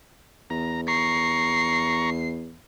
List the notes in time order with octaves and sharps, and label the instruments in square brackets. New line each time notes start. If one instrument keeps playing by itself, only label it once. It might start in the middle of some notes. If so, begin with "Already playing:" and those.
[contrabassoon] E2 [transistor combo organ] A#5
[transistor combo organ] A#5 C#6 [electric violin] C7